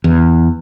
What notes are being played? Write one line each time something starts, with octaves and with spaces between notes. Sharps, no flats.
E2